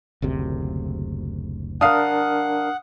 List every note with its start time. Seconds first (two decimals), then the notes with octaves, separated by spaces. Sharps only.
0.22 F#1 D2 C3
1.81 D4 A#4 F5 F#5 D#6